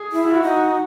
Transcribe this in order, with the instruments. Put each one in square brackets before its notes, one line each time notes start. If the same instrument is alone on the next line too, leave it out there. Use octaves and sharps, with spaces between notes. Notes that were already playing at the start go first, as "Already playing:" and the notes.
Already playing: [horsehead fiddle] G#4
[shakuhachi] E4
[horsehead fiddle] F#4
[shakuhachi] D#4